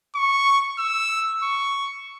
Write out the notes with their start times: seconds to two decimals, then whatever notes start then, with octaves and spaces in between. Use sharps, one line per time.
0.15 C#6
0.78 E6
1.43 C#6